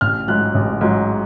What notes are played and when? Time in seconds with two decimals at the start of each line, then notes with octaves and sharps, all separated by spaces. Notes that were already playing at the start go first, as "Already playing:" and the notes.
0.01 A1 F6
0.28 G#2 F#3 F#6
0.55 A1
0.81 G#2 F#3